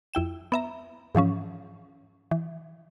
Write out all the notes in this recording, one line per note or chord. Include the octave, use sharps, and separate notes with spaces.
F2 E4 G5 E7
B3 E5 A#5
G#2 E3 F3 C#4
E3